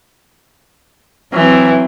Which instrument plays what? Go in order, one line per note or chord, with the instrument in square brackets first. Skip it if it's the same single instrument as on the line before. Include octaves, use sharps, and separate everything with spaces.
[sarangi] E3 [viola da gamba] F#3 C4